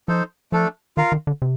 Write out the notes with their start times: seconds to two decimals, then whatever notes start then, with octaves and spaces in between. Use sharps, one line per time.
0.08 F3 D#4 A4 C5
0.52 F3 A3 D4 A4
0.97 D#3 F4 A#4 F5
1.12 D#3
1.27 D3
1.42 C3